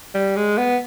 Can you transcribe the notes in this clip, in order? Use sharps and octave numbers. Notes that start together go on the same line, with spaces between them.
G3
G#3
B3